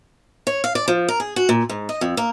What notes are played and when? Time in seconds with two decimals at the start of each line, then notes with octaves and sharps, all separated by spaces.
0.47 C#5
0.64 F5
0.75 D5
0.88 F3
1.08 A#4
1.20 G#4
1.36 F#4
1.49 A#2
1.69 G#2
1.89 D#5
2.01 F2
2.17 A#3